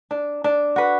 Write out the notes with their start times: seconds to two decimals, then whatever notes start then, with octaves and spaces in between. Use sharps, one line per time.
0.11 D4
0.44 D4
0.76 F#4 B4